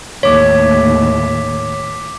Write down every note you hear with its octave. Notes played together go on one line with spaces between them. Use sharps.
D#2 A2 C#5 D6 B6